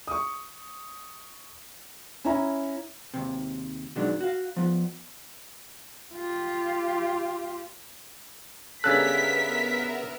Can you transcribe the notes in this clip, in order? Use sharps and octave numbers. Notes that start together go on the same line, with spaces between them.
C#6 D#6
C#4 E4 A#5
D#2 C3
B2 D#3 F#3 G#3 D4
F#4 F5
F3 B3
F4 G4
G2 C#3 B3 A4 A#4 E5 F#6 B6